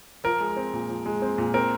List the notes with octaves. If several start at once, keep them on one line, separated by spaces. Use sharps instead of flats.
F3 A#4
G#3
C4
A#2
F3
G#3
C4
A#2
C4 A#4